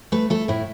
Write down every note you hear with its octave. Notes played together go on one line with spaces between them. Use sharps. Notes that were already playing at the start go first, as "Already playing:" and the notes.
A3 B4
A3 A4
A2 E4